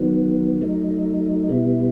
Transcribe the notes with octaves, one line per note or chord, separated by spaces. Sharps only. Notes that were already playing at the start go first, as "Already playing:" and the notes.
Already playing: D#3 F#3 B3
F#3 A3 D#4
B2 G3 B3 E4